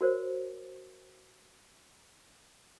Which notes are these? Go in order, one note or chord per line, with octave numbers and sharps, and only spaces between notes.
F#4 A#4 C5 C#5